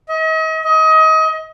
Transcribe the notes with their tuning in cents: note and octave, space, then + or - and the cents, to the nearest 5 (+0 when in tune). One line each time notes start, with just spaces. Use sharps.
D#5 +40
D#5 +30